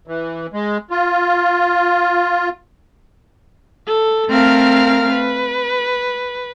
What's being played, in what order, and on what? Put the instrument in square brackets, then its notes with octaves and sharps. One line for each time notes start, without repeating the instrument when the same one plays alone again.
[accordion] E3
G#3
F4
[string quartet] A4
A3 C4 A#4 F5 F6
B4